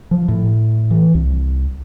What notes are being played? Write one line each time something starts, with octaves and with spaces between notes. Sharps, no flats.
F3
A2
E3
C2